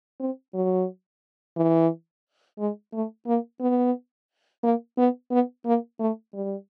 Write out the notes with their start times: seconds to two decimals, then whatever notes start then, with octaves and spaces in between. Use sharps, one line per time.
0.20 C4
0.54 F#3
1.57 E3
2.59 G#3
2.93 A3
3.27 A#3
3.61 B3
4.63 A#3
4.98 B3
5.31 B3
5.66 A#3
6.00 A3
6.34 G3